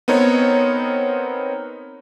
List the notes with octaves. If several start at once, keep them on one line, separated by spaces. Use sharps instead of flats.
B3 C4 D#4 A#4 C#5